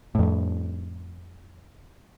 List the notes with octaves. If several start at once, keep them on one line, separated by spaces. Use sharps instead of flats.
F2 A2